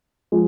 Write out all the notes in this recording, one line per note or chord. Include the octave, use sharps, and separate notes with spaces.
F3 G#3